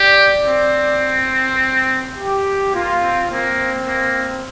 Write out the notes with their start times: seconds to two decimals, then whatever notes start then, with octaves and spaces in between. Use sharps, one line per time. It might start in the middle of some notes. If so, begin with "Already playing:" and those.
Already playing: G4 D5
0.45 C4
2.16 G4
2.73 A#3 F4
3.02 C4
3.30 A#3 C4
3.88 A#3